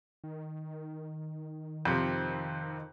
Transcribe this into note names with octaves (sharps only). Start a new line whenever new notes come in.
D#3
F2 C3 C4